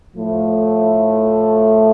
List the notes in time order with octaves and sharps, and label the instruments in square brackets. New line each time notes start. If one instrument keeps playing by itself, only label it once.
[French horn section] A2 F3 A3